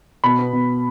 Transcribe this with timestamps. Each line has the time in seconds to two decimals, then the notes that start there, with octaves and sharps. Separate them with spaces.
0.24 B2 B5
0.38 B3
0.53 B2